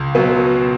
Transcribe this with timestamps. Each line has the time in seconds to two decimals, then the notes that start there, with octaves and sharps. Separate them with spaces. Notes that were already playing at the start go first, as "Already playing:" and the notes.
Already playing: C#2
0.15 B2 F#3 B3